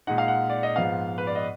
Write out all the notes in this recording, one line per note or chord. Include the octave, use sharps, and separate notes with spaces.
A#2 G#3 D#4 F#5
F5
F#5
D5
D#5
G#2 F3 B3 F5
B4
D5
D#5